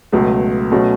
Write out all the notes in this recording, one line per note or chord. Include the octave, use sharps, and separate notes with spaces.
C#2 B2 F#3 A3
B2 F#3 A3 C#4